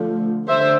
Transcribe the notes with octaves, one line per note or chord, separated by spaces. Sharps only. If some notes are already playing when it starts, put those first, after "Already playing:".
Already playing: D3 F3 A3
D3 C5 E5